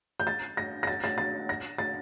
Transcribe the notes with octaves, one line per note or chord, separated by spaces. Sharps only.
G6
A6
A#6
A#6
A6
A6
A6
A#6
A6